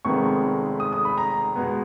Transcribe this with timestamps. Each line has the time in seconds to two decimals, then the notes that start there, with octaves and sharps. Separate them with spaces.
0.05 F1 F2 D#3 G#3 B3 C#6
0.80 D#6
0.93 D#6
1.05 B5
1.18 A#5
1.56 B2 G#3 B3